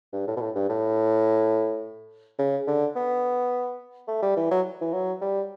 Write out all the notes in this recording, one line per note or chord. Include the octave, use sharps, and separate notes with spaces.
G2
A2
B2
A2
G2
A2
C#3
D3
B3
A3
G3
E3
F#3
E3
F#3
G3